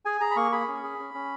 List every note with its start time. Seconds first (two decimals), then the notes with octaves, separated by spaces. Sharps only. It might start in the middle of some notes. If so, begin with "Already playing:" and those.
0.05 G#4 G#5
0.21 G#4 A#5
0.31 B5
0.36 A#3 C#6
0.52 G#4 B5
0.68 C#4
0.83 G#4
0.99 C#4
1.14 C#4